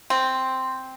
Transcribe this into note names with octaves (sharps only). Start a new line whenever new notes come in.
C4